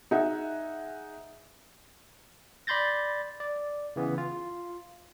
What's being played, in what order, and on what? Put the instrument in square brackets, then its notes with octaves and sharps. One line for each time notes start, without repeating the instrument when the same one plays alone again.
[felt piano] D#4 G#4 E5 F#5
[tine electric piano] D5 B5 C6 G6 A6 A#6
D5
C#3 E3 B3
F4